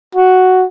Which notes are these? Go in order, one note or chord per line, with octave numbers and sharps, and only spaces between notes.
F#4